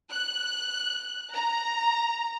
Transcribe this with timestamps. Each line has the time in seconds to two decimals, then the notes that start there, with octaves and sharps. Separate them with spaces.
0.11 F#6
1.34 A#5